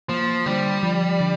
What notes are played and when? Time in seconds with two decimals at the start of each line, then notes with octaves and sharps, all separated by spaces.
0.09 F3 A#3
0.46 D3 G3
0.83 F3
1.20 D3